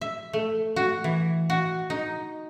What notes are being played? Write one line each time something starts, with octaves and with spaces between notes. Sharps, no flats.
E5
A3
F#4
E3
F#4
D#4